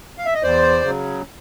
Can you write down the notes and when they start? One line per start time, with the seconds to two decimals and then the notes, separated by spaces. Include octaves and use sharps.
0.18 F5
0.26 E5
0.34 D#5
0.42 E2 C5 D5
0.82 C#3 F#3